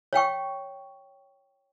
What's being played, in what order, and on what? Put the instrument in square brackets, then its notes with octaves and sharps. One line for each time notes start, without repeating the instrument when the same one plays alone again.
[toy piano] C#5 F5 G5 C#6